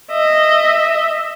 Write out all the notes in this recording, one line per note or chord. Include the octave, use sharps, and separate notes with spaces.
D#5 E5